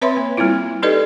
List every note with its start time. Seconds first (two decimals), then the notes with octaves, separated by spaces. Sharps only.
0.02 C4 B4 C#5 E5 B5 C6
0.17 A#3
0.37 G3 A#3 C4 E4 F4
0.83 D#4 G4 A4 B4 D5 D#5